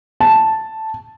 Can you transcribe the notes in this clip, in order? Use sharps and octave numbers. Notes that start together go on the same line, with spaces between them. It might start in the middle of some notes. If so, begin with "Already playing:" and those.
A5